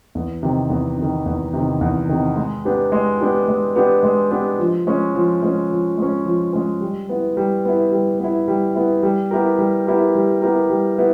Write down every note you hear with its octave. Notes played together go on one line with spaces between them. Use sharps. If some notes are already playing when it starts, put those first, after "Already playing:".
E2
C3 D#3
E2
C3
D#3
E2
C3 D#3
E2
C3 D#3
G#3
B3 D4 G4
G#3
B3 D4 G4
G#3
B3 D4 G4
G#3
B3 D4 G4
F3
G#3 C#4
F3
G#3 C#4
F3
G#3 C#4
F3
G#3 C#4
G3
B3 E4
G3
B3 E4
G3
B3 E4
G3
B3 E4
G3
B3 E4 G4 A#4
G3
B3 E4 G4 A#4
G3
B3 E4 G4 A#4
G3
B3 E4